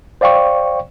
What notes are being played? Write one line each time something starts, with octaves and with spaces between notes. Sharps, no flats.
C5 D5 F5 G5 C#6